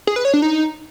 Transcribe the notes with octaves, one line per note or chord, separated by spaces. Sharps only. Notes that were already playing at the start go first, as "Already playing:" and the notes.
G#4
B4
C#5
D4
D#4